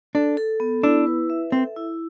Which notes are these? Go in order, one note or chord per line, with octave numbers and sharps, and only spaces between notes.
D4 A4
A4
B3
D4 E4
B4
E5
C4 A4
E4